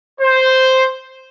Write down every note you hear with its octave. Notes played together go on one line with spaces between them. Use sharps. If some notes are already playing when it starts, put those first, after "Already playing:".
C5